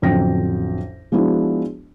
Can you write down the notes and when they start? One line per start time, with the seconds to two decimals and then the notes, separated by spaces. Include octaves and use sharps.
0.02 A1 F2 D3 F#3 G5 A#6
1.12 F3 G#3 B3 D4 E4 F#4